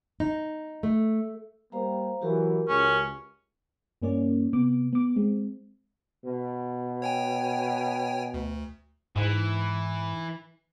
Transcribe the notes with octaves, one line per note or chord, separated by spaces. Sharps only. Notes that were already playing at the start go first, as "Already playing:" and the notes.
D#4
A3
G3 A#3 C5 F5 A#5
E3 F#3 F#4 G4 A#4
C#2 C#4
G2 A#3 C#4 D5
C3 B3 D6
B3 D6
G#3 C4
B2
C#5 G5 G#5
D2
G#2 E3